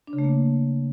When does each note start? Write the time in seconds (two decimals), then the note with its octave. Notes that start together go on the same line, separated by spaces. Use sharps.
0.07 D4
0.13 C#3
0.19 A3
0.24 A#3